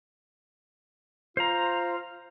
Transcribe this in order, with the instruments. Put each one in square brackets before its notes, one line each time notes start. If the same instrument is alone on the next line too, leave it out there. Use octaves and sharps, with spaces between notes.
[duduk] F4 [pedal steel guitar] C5 A#5